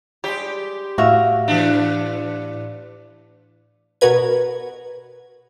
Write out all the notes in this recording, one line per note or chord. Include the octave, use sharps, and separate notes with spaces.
G3 G#3 G4
A2 F#4 E5 F5 A#6
E3 D4
B2 B3 F#4 A#4 B4 G#6